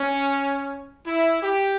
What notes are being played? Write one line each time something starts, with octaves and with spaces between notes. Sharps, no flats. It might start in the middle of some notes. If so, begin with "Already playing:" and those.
Already playing: C#4
E4
G4